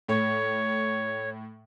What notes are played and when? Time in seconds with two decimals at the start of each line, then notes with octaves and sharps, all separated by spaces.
0.08 A2 C#5